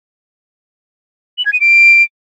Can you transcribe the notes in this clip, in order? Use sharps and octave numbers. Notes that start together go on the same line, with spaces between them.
F#7
G#6
D#7
D7